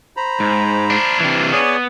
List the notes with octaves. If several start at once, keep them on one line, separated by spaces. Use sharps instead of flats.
C5 A#5 B5
G#2
D4 F4
C3 E3 G3
B3 G#4 C#5 D5